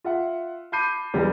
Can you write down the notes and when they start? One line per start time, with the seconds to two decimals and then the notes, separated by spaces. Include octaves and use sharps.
0.04 F4 E5 F#5
0.72 A5 B5 D6 G6 C7 D#7
1.14 B1 E2 D3 G3